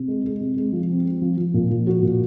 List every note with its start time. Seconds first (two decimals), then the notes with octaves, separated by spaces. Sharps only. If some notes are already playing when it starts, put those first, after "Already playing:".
Already playing: C3
0.08 G#3
0.25 G#3
0.40 C3
0.57 G#3
0.73 F3
0.90 C4
1.05 C4
1.22 F3
1.37 F3
1.54 A#2
1.70 F3
1.87 F#4
2.03 A#2